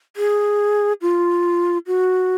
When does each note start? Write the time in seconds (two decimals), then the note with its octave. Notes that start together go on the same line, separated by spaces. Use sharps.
0.16 G#4
1.02 F4
1.87 F#4